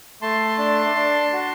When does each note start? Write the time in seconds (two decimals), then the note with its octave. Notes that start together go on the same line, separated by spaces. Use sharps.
0.22 A3 A5 C6
0.58 D4
0.96 D4
1.33 F#4